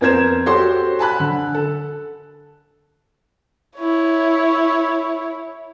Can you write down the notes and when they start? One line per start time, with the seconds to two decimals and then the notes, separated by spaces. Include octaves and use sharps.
0.01 F2 B3 A#4 C5 G#6 E7
0.46 F#4 G4 A4 C5 C#5 C6
0.99 G#5 A5 B5 F#6
1.20 D3
1.54 A4
3.78 E4 C#5